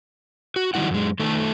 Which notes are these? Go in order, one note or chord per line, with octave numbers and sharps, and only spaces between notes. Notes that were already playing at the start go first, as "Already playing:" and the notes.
F#4
D#3 F#3 G3 E4 F#5
F#2 G#3
D#3 A3 A4